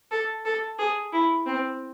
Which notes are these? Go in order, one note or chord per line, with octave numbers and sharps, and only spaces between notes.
A4
A4
G#4
E4
C4